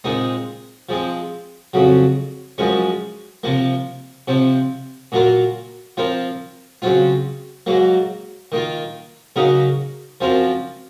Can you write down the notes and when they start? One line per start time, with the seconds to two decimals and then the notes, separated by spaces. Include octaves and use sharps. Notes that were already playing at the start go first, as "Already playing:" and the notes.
0.04 A#2 G#3 C4 D#4
0.89 F3 G#3 C4
1.73 F2 C#3 F#3
2.58 F#2 F3 G#3 C#4
3.43 C3 F3 A#3
4.28 C3 F3 C4
5.12 A#2 F#3 A#3 F4 A#4
5.97 F3 C4 F4 A#4
6.82 C#3 F#3 C4 F4
7.66 G#2 F#3 A#3
8.52 D#3 A#3 F4
9.36 C#3 F#3 A#3 D#4 A#4
10.21 F#2 F3 C4 F4 A#4